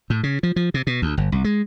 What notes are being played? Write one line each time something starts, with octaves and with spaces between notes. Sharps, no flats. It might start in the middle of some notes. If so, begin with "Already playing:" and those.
A2
C#3
F3
F3
C3
B2
D2
G1
C2
G#3